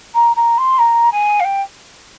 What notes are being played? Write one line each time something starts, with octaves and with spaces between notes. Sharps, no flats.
A#5
A#5
C6
A#5
G#5
F5
G5